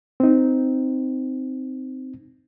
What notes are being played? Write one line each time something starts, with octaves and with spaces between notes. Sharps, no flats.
C4 D#4